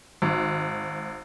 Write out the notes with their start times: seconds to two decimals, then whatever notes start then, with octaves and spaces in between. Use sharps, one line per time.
0.22 G#1